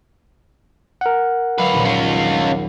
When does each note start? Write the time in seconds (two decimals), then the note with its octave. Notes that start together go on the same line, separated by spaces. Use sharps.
1.01 A#4 F#5
1.58 F#3 F4 B4
1.73 A#1 D#2 A#2
1.85 C#4 F4